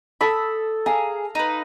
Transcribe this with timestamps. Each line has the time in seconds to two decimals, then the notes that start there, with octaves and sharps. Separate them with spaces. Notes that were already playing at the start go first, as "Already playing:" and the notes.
0.21 A4 B5 D#6 E6
0.86 G#4 F5 A#5
1.35 D#4 B4